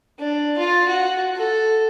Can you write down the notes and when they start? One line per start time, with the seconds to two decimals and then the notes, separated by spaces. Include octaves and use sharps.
0.19 D4
0.58 F4
0.89 F#4
1.36 A4